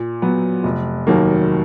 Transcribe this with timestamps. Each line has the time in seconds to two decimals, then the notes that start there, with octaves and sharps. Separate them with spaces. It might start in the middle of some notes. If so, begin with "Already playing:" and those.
Already playing: A#2
0.22 F#3 B3
0.63 F1
1.07 D#2 D#3 F#3 A#3